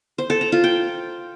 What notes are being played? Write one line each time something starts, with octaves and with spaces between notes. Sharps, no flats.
C5
A4
A#5
F4
G5